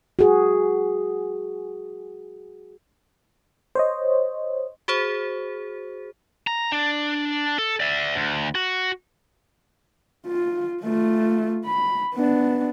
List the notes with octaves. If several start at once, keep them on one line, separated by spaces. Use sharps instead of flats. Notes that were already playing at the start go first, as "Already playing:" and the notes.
F#4 G#4
C5 C#5 D#5
F#4 G#4 C5
A#5
D4
A4
D5 E5
D2
F#4
F4
A3 F4
B5
B3 D4